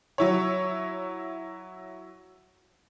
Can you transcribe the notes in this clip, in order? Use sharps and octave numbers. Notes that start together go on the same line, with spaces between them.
F#3 E4 C#5